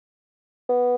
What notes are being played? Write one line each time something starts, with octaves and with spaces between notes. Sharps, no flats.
B3